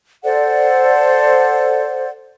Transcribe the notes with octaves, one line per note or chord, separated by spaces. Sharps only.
A4 C5 D5 F#5